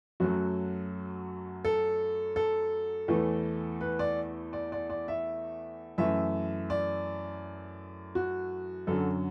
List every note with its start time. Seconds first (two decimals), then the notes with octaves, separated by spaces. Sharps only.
0.20 F#2 F#3 A3 F#4
1.65 A4
2.36 A4
3.08 E2 E3 A3
3.81 B4
3.99 D5
4.53 D5
4.72 D5
4.90 D5
5.08 E5
5.98 F#2 E3 A3 E5
6.70 D5
8.15 F#4
8.87 F#2 D3 F#3 A4